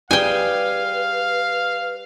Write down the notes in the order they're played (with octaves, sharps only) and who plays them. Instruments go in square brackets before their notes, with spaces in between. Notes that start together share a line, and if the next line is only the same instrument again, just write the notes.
[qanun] G3 G#4 [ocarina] B4 [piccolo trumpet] F5 [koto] G5 G#5